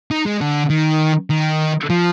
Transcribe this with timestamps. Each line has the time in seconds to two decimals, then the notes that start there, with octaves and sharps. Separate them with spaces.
0.11 D#4
0.26 G#3
0.41 D3
0.70 D#3
1.30 D#3
1.90 F3